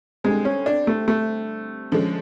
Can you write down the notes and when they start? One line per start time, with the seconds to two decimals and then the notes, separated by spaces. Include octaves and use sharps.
0.24 D3 G3 G#3 C4
0.45 C#4
0.66 D4
0.87 A3
1.08 A3
1.92 D3 F3 G#3 C#4